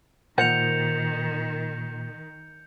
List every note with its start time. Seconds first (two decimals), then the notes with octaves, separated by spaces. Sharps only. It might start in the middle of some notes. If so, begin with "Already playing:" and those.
0.38 A#2 D#3 A#4 C5 F#5 G6 C#7 F7